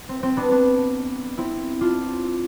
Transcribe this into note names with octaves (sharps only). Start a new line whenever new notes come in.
C4
C4
B3 D4
B3 D4
C4 E4
D4 F4